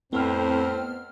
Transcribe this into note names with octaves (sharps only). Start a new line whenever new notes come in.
F2 A2 B3 C4 F6